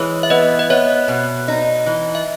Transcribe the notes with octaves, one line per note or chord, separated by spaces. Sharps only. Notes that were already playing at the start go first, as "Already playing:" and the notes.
Already playing: E3 G#3 C#5
E5
B3 B4 D#5
D#5
B3 C#5 E5
B2
D#4
E3
E5